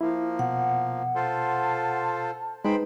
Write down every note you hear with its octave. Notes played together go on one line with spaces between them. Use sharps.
F3 A#3 E4
B2 F#5
F4 A4 C5 A5
G#3 D#4 B4 C5 G5 B5